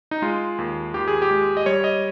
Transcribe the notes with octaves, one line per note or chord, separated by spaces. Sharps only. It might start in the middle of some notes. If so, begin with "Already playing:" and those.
D#4
G#3 F4
D#2
D#2 G4
G#4
G4
G#3
D#5
G3 C#5
D#5